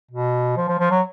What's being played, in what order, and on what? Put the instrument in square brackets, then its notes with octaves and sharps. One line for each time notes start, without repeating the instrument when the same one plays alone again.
[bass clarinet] B2
F3
F3
F3
F#3